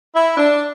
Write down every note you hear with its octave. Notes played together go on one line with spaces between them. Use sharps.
E4
D4